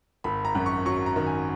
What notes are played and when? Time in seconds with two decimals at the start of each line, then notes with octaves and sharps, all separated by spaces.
0.24 G#1 B5
0.45 A#5
0.55 F#2
0.66 C#6
0.85 F#3 C#6
1.06 A#5
1.16 D#3
1.26 G#5